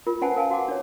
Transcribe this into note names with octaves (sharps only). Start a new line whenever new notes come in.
F4 A#4
C#4 B4 C5 F#5 G#5 A5
A#4 F5 G#5 A5
F#4 F#5 D6
D4 A#4 C#5